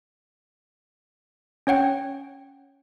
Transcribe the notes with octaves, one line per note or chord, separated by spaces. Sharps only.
C#4 C#5 F#5 G5